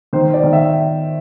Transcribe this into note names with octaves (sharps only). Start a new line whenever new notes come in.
D#3 C5
D5
D#3
E5